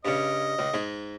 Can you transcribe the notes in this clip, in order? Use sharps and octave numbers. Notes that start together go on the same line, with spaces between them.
G2 C#3 D#5
C#2
G#2 G#3